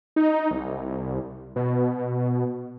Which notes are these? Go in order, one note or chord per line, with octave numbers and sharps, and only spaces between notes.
D#4
C2
B2